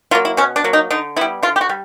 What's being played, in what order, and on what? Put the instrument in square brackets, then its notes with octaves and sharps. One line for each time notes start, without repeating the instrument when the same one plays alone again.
[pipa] F#3 F4
A#3
E4
B2 C#4
D4
F#3 A#3
D#4
D3 D#4
G3 B3 E4
D3 F4
G4
F#4
G3